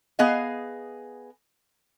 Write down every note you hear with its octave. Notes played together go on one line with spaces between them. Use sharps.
B3 G#4 D#5 F5